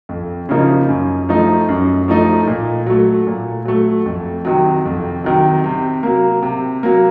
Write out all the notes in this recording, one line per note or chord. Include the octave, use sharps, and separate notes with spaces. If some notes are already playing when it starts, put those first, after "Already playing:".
F2
C#3 F3 A#3 D#4
F#2
F3 A3 D#4
F#2
F3 A3 D#4
A#2
F#3 A3
A#2
F#3 A3
F2
C3 D#3 F#3
F2
C3 D#3 F#3
C3
F#3 A#3
C3
F#3 A#3